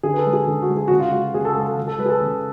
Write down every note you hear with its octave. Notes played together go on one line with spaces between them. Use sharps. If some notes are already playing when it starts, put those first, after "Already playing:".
D3 G#4
B4
A4
G#3
G#4
D3
F#4
G#3
G#4
C#3 F#4
F4
G#3 F#4
C#3 G#4
A4
G#3 A4
A4
C#3
A4
G#3 B4
G#4
A4
C#3